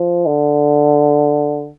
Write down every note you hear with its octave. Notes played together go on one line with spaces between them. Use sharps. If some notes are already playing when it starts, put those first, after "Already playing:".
Already playing: F3
D3